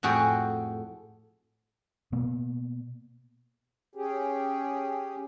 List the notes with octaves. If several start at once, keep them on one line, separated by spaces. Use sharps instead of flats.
F2 A2 F#4 G#4 G5
B2 A#3 B3
C#4 G4 G#4